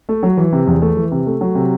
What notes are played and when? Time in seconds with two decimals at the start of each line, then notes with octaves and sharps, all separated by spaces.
0.09 A3
0.23 F#3
0.37 E3
0.52 C3
0.67 E2
0.82 A3
0.97 E3
1.11 C3
1.27 A3
1.41 F#3
1.55 C3